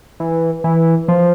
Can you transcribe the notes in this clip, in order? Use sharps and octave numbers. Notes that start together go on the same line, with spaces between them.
E3
E3
F3